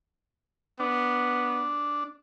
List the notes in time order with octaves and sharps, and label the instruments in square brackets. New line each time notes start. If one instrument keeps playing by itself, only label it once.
[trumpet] B3 [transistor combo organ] D4